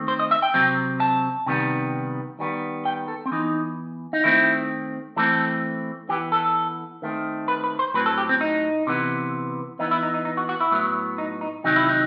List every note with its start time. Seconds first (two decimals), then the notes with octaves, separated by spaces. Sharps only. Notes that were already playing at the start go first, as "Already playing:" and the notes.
Already playing: D#3 A3 C4
0.08 C5
0.19 D#5
0.31 E5
0.42 G5
0.54 C3 F#3 C4
1.00 A5
1.46 C3 D#3 G3 B3
2.39 D#3 G3 B3
2.85 G5
3.08 A4
3.26 C4
3.32 E3 B3 D#4
4.13 D#4
4.24 D#3 A3 C4 E4
5.17 E3 A3 C4 A4
6.09 E3 B3 G4
6.32 A4
7.02 D#3 A3 C4
7.48 B4
7.64 B4
7.79 C5
7.94 A2 F#3 C4 B4
8.06 A4
8.18 G4
8.29 C4
8.41 D#4
8.87 C3 E3 B3
9.79 E3 B3 D#4
9.91 E4
10.03 D#4
10.14 D#4
10.25 D#4
10.37 F#4
10.49 F#4
10.61 E4
10.72 A2 F#3 B3
11.18 D#4
11.41 D#4
11.64 C3 D#3 F#3 D#4
11.76 E4
11.89 D#4